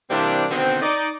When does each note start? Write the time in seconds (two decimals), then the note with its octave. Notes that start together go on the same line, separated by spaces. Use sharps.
0.10 C3 E3 G3 A#3 C4 D4
0.50 B2 D3 D#3 C4
0.82 D#4 D5